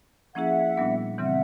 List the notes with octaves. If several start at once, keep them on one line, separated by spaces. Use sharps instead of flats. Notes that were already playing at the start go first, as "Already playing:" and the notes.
F3 A#3 C#4 E4 G#4 E5 F#5
A#2 G3 B3 D4
C#3 E3 G3 C4 E5 F#5